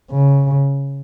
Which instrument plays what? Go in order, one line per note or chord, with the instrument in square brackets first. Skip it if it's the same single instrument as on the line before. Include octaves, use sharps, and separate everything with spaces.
[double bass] C#3